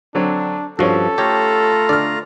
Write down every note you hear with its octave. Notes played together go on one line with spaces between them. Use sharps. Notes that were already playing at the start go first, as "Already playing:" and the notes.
D3 F#3 C4 D4
G2 F3 C#4 F#4 A4
A3 F4 G4 C#5 A#5
D3 D5 F6